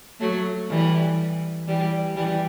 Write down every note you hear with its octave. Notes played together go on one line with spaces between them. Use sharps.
F#3 A3
E3 G3
E3 G3
E3 G3